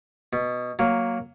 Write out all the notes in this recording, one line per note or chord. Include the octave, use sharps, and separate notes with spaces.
B2
F#3 A#3